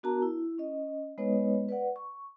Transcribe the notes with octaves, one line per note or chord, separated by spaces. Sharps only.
B3 D4 F#4 A#4 A5 A#5
E4
C#4 D#5
G#3 B3 D#4 B4 C#5 D#5
B4 D5 F#5
C#6